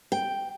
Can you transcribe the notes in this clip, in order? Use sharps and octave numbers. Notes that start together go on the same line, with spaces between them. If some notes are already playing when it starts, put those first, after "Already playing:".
G5